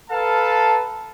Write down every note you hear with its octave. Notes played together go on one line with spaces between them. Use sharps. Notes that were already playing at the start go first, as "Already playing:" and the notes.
A4 B4 F5 A5 A#5